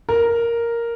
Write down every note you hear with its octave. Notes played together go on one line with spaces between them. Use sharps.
A#4